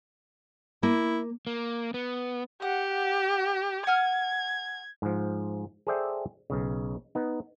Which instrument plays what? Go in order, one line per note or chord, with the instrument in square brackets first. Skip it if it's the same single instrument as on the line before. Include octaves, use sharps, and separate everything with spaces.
[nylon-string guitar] A#3 [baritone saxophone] E4
[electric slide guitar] A#3
B3
[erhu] G4 [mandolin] F#5
[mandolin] F#5 G#5 F6 [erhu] G#6
[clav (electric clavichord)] G#2 F3
G#4 A4 C5 D5 E5 G5
B1 C#3
B3 D#4